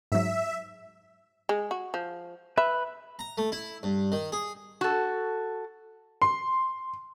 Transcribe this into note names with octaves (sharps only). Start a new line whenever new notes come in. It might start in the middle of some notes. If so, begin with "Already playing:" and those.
G#2 F#3 E5
G#3
F#4
F3
B4 E5
A#5
A3
E4
G2
D#3
G#4
F#4 A4
C6